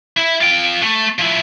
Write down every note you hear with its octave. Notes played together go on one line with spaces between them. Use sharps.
E4
F4 G5
A3
F3 E4